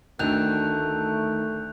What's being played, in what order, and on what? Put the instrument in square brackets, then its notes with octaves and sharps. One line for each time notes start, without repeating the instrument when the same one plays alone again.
[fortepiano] D2 D3 [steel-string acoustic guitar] D#3 [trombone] A3 [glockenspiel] F#6 G6 F7